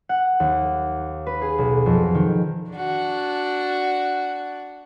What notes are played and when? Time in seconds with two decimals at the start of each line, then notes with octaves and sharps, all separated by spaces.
0.09 F#5
0.40 D#2
1.27 B4
1.42 G#4
1.58 B1
1.86 F2
2.15 D#3
2.72 D4 F#4